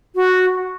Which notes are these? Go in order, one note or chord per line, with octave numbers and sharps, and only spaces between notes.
F#4